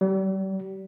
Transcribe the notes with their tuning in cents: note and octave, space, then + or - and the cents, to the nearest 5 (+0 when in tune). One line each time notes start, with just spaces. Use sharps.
G3 -35